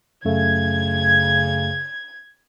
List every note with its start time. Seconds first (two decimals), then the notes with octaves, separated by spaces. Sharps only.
0.25 F#2 C#3 A3 G#6